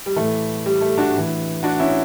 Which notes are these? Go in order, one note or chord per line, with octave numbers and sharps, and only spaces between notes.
G3
A2 E3 A3
G3
A3
D4 F#4
A2 E3
D4 F#4
C#4 E4